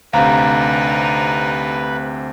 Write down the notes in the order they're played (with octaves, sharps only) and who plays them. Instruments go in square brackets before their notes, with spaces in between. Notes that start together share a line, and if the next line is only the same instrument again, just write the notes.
[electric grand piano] D2 C3 [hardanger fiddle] D4 D#4 [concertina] B4 [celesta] F5 A#5